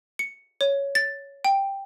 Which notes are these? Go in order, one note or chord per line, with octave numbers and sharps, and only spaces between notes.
C#7
C#5
A6
G5